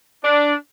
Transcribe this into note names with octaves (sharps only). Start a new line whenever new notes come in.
D4